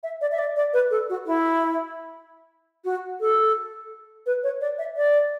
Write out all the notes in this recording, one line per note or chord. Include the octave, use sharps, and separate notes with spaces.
E5
D5
E5
D5
D5
B4
A4
F#4
E4
F#4
A4
B4
C#5
D5
E5
D5